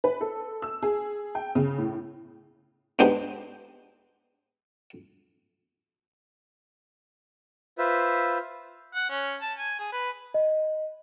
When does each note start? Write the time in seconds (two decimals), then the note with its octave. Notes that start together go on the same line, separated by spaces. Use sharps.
0.04 B4
0.21 A4
0.62 E6
0.83 G#4
1.35 G5
1.55 C#3
1.78 A2
2.99 G#2 B3 D4 D#4 G4 C5
7.78 F4 B4 C5 E5
8.95 F#5
9.10 C#4
9.42 A5
9.58 G#5
9.79 G#4
9.92 B4
10.34 D#5